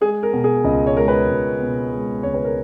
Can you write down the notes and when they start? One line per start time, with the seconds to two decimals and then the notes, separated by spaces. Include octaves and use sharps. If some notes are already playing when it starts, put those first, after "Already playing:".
0.01 G#3 G#4
0.23 A#4
0.33 B2
0.44 G#4
0.64 C#2 D#5
0.87 C#5
0.96 G#3 A#4
1.08 B4
1.28 C#2
1.60 B2
1.93 G#3
2.23 C#2 C#5
2.34 B4
2.45 A#4